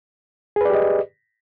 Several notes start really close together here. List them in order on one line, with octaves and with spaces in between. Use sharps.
G#4 B4 D5 G4 D#5